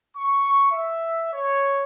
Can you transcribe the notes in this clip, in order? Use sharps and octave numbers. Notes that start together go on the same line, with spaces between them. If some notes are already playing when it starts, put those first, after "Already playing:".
C#6
E5
C#5